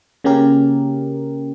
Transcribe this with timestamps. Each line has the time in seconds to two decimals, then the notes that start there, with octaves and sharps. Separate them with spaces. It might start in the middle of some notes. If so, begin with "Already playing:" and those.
0.24 C#3 A#3 C#4 G4 A#4